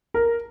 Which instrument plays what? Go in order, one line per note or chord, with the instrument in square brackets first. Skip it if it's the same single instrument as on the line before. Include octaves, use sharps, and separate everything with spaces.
[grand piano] A#4